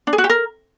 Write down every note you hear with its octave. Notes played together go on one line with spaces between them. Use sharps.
D4
G#4
F#4
G4
A#4